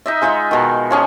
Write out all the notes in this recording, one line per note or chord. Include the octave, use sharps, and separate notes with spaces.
D#4 D#5 E5
G#3 D#4 F4 E5
B2 D#3
F3 C#4 G#4